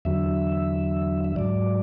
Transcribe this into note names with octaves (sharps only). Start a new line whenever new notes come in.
E2 D3 F#3 E5
E5
G#2 F#3 D5